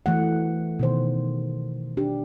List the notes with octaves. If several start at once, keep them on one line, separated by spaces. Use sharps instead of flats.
E3 A3 F#5
B2 D#3 C5
D4 G4